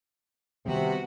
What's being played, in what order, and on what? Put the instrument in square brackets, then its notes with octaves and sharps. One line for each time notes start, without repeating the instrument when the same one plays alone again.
[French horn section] C3 [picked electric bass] D#3 G3 C4 [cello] B3 F#4